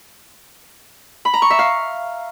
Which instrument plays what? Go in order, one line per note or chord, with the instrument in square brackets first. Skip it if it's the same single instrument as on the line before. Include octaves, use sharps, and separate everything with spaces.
[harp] B5
A#5
C#6
E5
F5